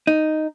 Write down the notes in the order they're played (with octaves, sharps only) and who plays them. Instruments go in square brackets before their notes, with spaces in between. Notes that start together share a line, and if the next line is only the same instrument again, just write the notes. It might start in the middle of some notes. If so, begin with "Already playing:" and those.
[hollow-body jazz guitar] D#4